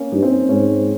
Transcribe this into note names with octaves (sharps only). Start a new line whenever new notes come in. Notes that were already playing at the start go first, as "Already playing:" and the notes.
Already playing: A#3 C#4
G2 D#4
C4
C#4
G#2 C#4